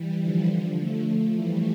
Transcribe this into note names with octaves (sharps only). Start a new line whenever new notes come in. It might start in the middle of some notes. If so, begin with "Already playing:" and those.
Already playing: E3 G3
D3 F3
F3 A3
E3 G3